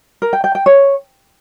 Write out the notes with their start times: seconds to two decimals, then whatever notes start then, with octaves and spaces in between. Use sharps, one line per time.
0.22 A#4
0.33 G5
0.44 G5
0.55 G5
0.66 C#5